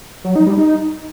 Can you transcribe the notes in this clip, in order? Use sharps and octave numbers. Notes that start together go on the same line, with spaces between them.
F#3
D#4
G3
D#4